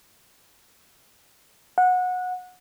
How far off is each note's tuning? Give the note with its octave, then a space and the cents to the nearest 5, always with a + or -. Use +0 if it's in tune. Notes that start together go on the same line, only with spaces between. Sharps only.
F#5 -20